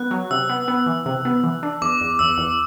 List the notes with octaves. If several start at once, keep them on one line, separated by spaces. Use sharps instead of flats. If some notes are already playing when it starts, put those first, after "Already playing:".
Already playing: B3 F#6
F#3
C3 E6
B3
B3
E3
C3
B3
E3
D4
E2 D6
E2
E2 E6
E2